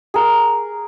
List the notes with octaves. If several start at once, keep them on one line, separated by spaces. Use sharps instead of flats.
G#4 A#4